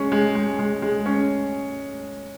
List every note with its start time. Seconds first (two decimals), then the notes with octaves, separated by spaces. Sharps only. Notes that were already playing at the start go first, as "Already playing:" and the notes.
Already playing: G#3 C#4
0.12 G#3
0.35 G#3
0.59 G#3
0.82 G#3
1.06 C#4